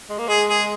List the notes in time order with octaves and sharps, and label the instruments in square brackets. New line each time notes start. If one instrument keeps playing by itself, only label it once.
[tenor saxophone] G#3
A#3
[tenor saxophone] G#3 [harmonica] G#4
[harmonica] G#4